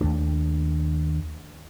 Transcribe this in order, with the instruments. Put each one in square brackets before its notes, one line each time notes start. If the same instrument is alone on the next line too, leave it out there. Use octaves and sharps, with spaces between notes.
[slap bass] D#2 A3 D4